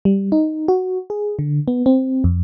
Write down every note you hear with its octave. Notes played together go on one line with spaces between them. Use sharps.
G3
D#4
F#4
G#4
D3
B3
C4
F2